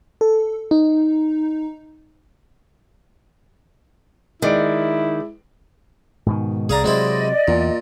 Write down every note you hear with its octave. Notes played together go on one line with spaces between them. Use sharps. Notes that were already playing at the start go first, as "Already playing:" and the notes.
A4
D#4
D#3 G#3 E4 D5 D7
G#2 B2 D#3
C2 G#4 D5 F5 A#5
C3 F#3 G#3 C4 E4 D5 D#5
E2 A#2